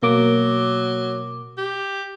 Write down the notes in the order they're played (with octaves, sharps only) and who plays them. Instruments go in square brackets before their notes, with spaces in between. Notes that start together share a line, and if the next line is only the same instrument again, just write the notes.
[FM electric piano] B2 A#3 D6 [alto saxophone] F#3
[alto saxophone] G4